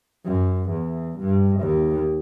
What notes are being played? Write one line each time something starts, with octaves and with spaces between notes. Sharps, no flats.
F#2
E2
G2
D#2